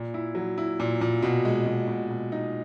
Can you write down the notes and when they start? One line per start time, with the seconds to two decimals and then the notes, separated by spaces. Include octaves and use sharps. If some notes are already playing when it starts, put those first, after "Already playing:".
Already playing: A#2
0.14 E4
0.35 F#3
0.58 E4
0.80 A#2
1.01 A#2
1.22 B2
1.45 G#3
1.66 B2
1.88 B2
2.09 B2
2.32 D#4